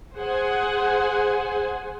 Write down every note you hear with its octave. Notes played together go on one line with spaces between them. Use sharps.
G#4 C5 F#5 G#5